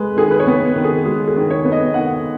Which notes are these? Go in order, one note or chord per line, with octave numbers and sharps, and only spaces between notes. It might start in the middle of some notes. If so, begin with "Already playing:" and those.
Already playing: G#3 B4
D#3 G#4
B4
C#5
B3
D#3
G#4
G#3
G#4
D#3
C#5
B3
D#5
D#3 F#5